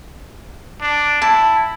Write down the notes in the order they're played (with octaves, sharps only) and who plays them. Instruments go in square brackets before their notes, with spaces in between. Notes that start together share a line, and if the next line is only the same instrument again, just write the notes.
[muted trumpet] D4
[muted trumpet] E4 [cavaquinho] A5